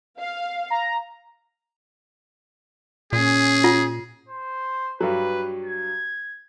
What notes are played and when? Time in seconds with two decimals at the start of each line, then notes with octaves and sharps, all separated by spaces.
0.19 F5
0.70 A#5
3.13 A#2 C#4 G#4
3.64 F4
4.29 C5
5.01 G2 F#3 B4
5.65 G#6